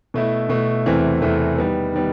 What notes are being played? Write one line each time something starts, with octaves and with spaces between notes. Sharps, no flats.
B2 A3 E4
B2 A3 E4
E2 C3 E3 A3 C4
E2 C3 E3 A3 C4
D#3 G3 B3
D#3 G3 B3